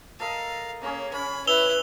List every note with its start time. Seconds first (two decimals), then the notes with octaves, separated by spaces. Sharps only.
0.20 A4 A#4 D#5 F5
0.82 C#3 A#3 C#4 G#4
1.13 C#4 B5
1.47 E4 B4 E6 F7 G7